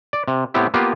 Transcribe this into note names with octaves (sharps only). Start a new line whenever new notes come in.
D5
C3
A2 B3 C4 E4 G4
A#3 B3 F4 G4 B4